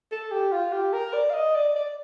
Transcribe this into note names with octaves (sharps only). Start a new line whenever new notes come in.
A4
G4
F4
G4
A#4
D5
F5
D#5
D5
D5